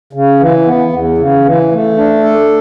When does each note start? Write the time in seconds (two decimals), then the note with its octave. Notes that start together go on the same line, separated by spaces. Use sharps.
0.13 C#3
0.40 E3
0.66 B3
0.93 E2
1.18 C#3
1.45 E3
1.71 A3
1.97 D4
2.24 A4